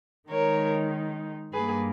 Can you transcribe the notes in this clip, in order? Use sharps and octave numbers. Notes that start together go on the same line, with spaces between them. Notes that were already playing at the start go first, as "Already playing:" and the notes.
D#3 G#3 D#4 A#4 C#5
G2 G3 A#3 G#4 B4